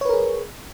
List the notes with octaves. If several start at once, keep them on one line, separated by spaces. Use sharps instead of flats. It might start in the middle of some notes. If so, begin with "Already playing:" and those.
G#4 A#4 B4 C#5